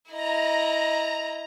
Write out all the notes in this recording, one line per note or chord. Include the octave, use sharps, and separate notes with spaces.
E4 D#5 A#5